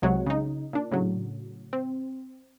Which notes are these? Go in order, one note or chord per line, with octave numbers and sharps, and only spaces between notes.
C2 C3 F#3 G#3 C#5 F#5
C#3 D#4
A#2 D4
A2 C#3 F#3
C4